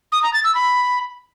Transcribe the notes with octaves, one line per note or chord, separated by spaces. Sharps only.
D#6
A#5
A6
E6
B5